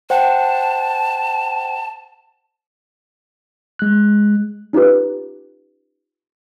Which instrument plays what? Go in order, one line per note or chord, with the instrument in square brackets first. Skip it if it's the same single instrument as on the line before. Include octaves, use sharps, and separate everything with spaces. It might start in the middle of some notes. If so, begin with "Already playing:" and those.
[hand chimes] C5 F#5 G5 [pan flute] A5
[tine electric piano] G#3 F#6
[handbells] C#4 D#4 F4 G4 B4